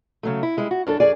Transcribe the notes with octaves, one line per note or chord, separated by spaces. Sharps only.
C#3 F#3 A3
E4
G3 G#3 E4
F#4
F#2 D4 A4
F#2 G#4 D5 G#5